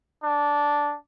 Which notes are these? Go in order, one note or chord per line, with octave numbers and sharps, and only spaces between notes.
D4